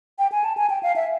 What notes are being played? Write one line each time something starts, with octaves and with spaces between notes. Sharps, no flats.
G5
G#5
A5
G#5
G5
F5
E5